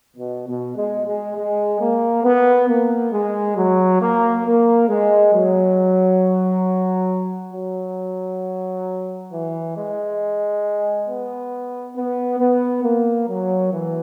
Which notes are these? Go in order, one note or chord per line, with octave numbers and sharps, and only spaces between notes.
B2
B2
G#3
G#3
G#3
A#3
B3
A#3
G#3
F#3
A#3
A#3
G#3
F#3
F#3
E3
G#3
B3
B3
B3
A#3
F#3
E3